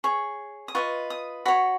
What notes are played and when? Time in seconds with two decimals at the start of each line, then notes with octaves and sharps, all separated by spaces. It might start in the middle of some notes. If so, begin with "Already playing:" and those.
0.04 G#4 C#5 C#6
0.68 D#6
0.75 F4 B4 D#5 C#6
1.10 D#6
1.45 F#4 C#5 B5